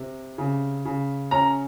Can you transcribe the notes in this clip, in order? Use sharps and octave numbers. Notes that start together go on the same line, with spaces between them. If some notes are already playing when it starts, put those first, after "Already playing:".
Already playing: C3
C#3
C#3
C#4 A#5